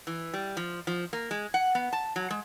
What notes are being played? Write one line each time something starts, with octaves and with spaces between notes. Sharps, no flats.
E3
G3
F3
F3
A#3
G#3
F#5
B3
A5
F#3
G#3